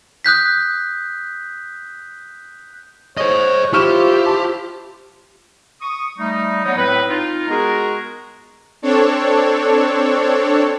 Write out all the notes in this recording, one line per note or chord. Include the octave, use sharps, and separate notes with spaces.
D#6 F#6 G6 B6
C5 C#5 D#5
E4 F4 G4 C5 C#6 F6 E7
A5
C#6 D#6
G3 A3 D#4
F#3 G3 A3 B3 C#4 D#4
A2 C4 B4
D#4 F4
G#3 B3 F#4 G#4 A#4
C4 D4 A4 C#5